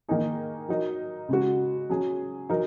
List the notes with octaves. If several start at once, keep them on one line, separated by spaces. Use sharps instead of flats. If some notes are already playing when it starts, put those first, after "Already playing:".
D#3 A#3 D#4 G#4
F#3 D#4 A#4
C#3 G#3 F#4
F#3 C#4 G#4
F#3 D#4 A#4